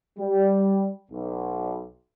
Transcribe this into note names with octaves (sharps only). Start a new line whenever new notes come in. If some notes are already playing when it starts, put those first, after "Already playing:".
G3
B1